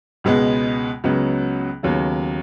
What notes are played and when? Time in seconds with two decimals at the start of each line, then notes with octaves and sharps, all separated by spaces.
0.24 C#2 B2 G#3 B3
1.04 C#2 C#3 F#3 B3
1.83 D#2 C#3 F#3 B3